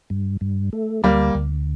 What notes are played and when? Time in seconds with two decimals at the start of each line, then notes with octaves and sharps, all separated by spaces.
0.10 G2
0.41 G2
0.73 A3
1.03 D2 G3 A#3
1.35 D2